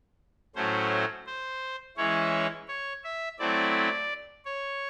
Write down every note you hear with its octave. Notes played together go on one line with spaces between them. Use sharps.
A2 F#3 A3 C#4 C5
C5
E3 G#3 C#4 E4 C#5
C#5
E5
F#3 A3 C4 E4 D5
C#5